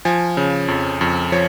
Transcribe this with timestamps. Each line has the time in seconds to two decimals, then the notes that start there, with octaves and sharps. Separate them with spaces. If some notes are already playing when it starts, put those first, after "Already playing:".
0.05 F3 G#5
0.37 C#3
0.68 F2
1.01 F2
1.32 F3 C#5